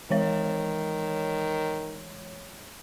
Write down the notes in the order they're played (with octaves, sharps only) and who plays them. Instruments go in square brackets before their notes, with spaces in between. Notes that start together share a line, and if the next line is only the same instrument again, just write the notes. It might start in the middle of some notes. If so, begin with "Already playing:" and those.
[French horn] D#3 [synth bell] E3 G#3 C#5